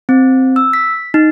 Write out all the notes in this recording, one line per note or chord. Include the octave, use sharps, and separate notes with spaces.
C4
E6
B6
D#4